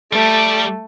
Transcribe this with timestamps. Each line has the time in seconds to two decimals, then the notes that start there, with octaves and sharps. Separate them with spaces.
0.13 G3 A3 G4